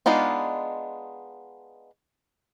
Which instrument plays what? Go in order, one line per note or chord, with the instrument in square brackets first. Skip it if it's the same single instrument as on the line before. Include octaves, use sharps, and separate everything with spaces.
[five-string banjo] G#3 B3 D4 D#4 F4